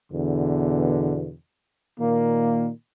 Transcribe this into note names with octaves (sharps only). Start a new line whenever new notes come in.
E2 B2 D3
A#2 D#3 A#3